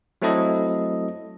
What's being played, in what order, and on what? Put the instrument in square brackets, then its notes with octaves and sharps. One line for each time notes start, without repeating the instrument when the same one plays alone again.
[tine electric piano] F#3 A3 C4 E4 A4 D#5